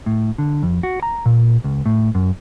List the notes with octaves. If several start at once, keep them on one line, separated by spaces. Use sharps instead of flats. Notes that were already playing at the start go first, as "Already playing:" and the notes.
A2
D3
F2
F#4
A#5
A#2
C#2
A2
F#2